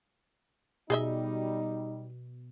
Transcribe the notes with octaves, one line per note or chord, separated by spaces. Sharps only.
B2 G3 D#4 G#4 D#5 E5